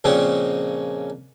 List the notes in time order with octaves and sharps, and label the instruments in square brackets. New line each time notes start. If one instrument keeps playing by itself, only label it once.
[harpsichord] F2 A#2 C#3 C4 C#4